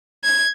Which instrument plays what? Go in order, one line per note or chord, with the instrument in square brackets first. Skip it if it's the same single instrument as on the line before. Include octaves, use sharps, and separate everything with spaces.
[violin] G#6